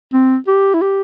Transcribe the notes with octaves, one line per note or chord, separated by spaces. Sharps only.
C4
G4
E4
G4